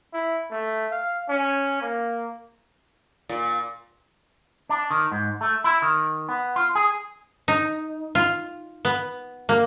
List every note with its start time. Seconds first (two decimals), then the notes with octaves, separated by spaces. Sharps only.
0.13 E4
0.50 A3
0.91 F5
1.29 C#4
1.81 A#3
3.29 A#2
4.69 D4
4.91 D#3
5.12 G#2
5.41 A3
5.64 E4
5.82 D#3
6.29 B3
6.56 F4
6.75 G#4
7.48 D#4
8.15 F4
8.85 B3
9.49 A#3